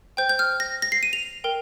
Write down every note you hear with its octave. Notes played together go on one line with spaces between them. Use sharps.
C5 G5 G6
G6
F6
A#6
A#6
C7
D#7
F7
A#4 G5